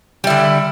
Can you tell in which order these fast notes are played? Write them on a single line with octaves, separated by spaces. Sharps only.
G3 E4 D3